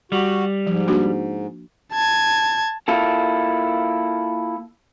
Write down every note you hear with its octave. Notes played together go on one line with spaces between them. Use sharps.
G3 F#4
G#2 F3
A#3 D4 F#4
A5 G#6
A#3 E4 F4 A4